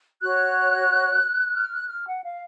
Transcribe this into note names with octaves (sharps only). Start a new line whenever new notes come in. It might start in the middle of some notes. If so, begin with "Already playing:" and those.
F#4 C#5 F#6
F6
F#6
F6
F#5
F5